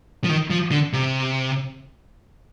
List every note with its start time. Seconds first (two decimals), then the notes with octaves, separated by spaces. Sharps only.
0.24 F3
0.29 D#3
0.50 F3
0.71 D3
0.93 C3